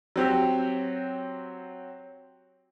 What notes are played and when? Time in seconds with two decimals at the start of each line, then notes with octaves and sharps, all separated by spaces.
0.16 F#3 C4 G4